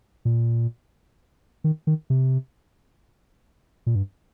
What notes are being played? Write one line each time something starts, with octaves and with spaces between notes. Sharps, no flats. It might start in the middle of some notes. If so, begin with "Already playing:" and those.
A#2
D#3
D#3
C3
A#2
G2